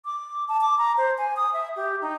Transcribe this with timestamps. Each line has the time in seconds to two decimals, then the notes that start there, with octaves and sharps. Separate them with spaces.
0.05 D6
0.48 A5
0.61 D6
0.78 A#5
0.98 C5
1.18 G#5
1.36 D#6
1.54 E5
1.76 G4
2.01 D#4